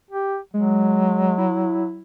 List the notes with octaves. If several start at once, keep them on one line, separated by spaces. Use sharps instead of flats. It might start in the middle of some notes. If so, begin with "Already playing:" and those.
G4
F#3 G#3
E4